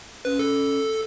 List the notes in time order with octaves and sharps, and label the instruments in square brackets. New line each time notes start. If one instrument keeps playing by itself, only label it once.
[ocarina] C#4 [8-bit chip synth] B4
[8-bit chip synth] A4